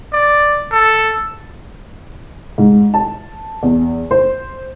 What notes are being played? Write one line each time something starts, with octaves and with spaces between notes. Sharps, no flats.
D5
A4
G#2
A5
E2
C5